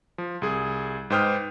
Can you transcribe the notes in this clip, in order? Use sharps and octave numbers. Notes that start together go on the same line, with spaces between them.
F3
C2 G#4
G#2 B4 C5 G5 D#6 F6